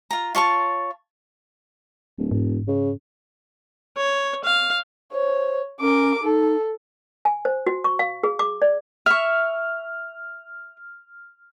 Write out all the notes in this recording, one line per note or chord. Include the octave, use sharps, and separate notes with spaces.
F4 A#5
F4 C#5 A5 C#6
D1
E1 G#2
C#3
C#5
F5
C5 C#5
C#4 A#4 D6
D#4 A4
G#5
C5
F#4
C#6
F5
G#4
D6
D5
E5 C#6 F6